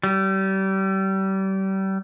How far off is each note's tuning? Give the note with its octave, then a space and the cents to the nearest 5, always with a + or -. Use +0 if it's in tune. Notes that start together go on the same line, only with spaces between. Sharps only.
G3 -30